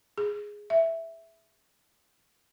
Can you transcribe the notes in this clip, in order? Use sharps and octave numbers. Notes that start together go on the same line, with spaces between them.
G#4
E5